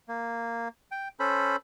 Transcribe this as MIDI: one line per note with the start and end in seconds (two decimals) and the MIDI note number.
0.08 0.68 58
0.91 1.08 79
1.20 1.56 61
1.20 1.56 69
1.20 1.56 72
1.20 1.56 83